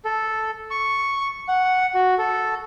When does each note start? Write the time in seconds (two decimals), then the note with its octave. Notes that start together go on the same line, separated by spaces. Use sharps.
0.05 A4
0.71 C#6
1.48 F#5
1.94 F#4
2.18 A4